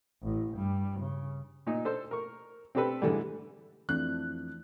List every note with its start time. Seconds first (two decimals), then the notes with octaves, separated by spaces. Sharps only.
0.22 A1 A2
0.55 G2 G3
1.00 C#3
1.67 A#2 D#4
1.85 D4 A4 C5
2.11 A#4 C#6
2.75 C4 D4 G4 A4 B4
3.02 G#2 D3 E3 G3
3.89 F2 E3 A3 D4 F#6